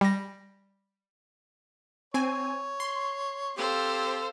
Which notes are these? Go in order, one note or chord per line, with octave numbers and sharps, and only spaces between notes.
G3 A#6
C4 C#5 G#5
C6
C4 G4 A4 C5 F5